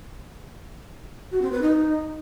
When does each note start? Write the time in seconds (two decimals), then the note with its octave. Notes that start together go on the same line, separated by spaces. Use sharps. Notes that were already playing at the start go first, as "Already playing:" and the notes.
1.31 F#4
1.41 C4
1.51 B4
1.61 D#4